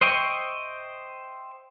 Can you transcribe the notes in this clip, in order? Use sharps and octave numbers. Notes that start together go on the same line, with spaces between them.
C5 D#5 E5 G5 C#6